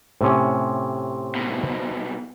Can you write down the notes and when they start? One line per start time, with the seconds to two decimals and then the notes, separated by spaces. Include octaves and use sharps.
0.21 A2 C3 C#4 C5 C6
1.35 C2 B2